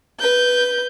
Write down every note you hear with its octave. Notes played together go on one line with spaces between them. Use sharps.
B4 G6